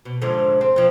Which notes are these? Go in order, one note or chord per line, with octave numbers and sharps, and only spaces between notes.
B2
G#2 D3 F3
C4
F2 F3